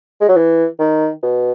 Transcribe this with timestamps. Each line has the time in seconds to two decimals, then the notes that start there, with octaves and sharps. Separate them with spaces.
0.21 G#3
0.28 F#3
0.36 E3
0.79 D#3
1.23 B2